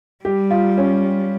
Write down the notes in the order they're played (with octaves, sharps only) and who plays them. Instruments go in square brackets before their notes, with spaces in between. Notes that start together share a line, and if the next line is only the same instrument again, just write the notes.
[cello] G3 [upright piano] G4
[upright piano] F4
C#4